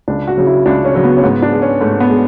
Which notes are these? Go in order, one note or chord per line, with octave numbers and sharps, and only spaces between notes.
C#2 D4
F#4
C#3 F#3
E4
C#2 D4
C#4
C#3 F#3
B3
C#4
G#2 B3
D4
G#3
C#4
G#2 A3
B3
G#3